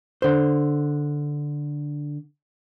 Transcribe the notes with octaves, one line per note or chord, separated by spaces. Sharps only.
D3 C5